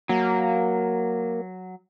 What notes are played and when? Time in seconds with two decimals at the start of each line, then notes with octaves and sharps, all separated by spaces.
0.09 F#3 A#3